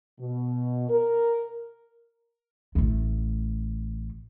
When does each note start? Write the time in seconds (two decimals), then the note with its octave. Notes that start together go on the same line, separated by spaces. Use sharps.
0.19 B2
0.89 A#4
2.75 A1 A3